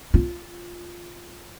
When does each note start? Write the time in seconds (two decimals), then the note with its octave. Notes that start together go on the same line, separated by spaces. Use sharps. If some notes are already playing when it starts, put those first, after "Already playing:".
0.14 F4